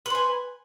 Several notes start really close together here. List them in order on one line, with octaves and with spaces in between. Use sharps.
B4 C5 G#5